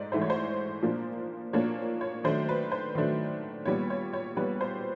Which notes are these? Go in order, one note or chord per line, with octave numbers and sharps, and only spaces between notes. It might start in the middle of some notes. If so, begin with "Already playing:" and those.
Already playing: G#2 A3 D5 D#5
G#2 E3 A3 C5
C#5
C5
A#2 F3 A#3 D4
A#2 F3 A#3 D4 C#5
C#5
D#3 F#3 A3 D4 C5
B4
C5
D#3 F#3 A3 D4
A#2 G3 B3 C#5
C#5
C#5
A#2 G3 B3 B4
C5